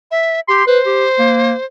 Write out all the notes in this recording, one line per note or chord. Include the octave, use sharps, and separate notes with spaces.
E5
G4 C6
B4 C5
G4
A#3